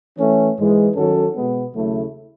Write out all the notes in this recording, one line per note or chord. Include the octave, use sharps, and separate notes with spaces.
E3 A3 C#4
G#2 E3 G#3
D#3 F#3 C#4 F#4 A4
B2 G#3 B3
D#2 C#3 F#3 A3 E4